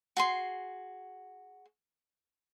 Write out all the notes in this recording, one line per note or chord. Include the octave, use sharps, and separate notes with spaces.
F#4 G#4 C6